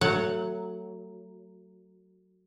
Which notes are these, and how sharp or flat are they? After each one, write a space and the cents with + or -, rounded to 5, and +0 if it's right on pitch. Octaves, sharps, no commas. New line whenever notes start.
F#3 +0 A3 +25 F#5 +0